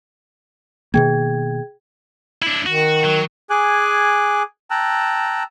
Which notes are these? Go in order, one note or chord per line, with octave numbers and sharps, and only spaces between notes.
B2 D#3 A#3 G#4 G5 G#6
D4 E4
D#3 F#4
F#3
G#4 G#5 D6 F#6
G5 A5 A#5 E6 F#6